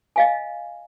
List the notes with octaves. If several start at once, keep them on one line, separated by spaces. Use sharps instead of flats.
D#5 F5 G#5